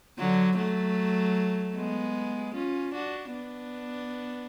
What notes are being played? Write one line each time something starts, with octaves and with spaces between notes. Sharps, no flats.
D3 F#3
F#3 A3
G#3 B3
C#4 F4
D4 F#4
B3 D4